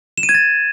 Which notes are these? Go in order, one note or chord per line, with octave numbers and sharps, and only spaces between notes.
E7
D#7
G#6
A6